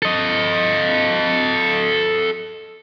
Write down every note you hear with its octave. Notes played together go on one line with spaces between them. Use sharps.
A4 D#5